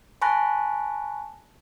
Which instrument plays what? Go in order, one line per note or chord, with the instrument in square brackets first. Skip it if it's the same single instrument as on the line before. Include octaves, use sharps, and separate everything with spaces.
[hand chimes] G#5 A5 B5 C#6 F#6 A#6